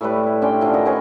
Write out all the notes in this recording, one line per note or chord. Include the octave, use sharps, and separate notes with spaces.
A2 G3 A3 B4
E4
C#4 D4 G5 C6
D3 F3
D#3 D#5 F#5
C#4 G#4 B4 C#5